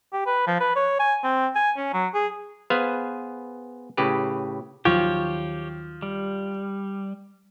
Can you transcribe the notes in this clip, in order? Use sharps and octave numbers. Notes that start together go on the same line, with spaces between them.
G4
B4
F3
B4
C#5
G#5
C4
G#5
C#4
F#3
G#4
B3 G#4 B4 C5 F5 G#5
A2 C#3 G4 B4
D#2 D#3 F3 F#3 G4 C#5
G3